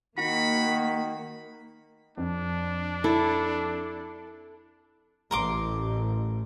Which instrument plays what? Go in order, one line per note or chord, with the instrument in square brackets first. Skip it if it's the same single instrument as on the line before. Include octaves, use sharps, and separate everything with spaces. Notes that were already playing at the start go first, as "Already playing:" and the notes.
[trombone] D#3 [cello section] A#3 [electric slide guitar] F#4 [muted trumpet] B5
[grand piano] F2 [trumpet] D4
[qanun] E4 [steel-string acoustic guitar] A4
[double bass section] A1 [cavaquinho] A#4 C6 D6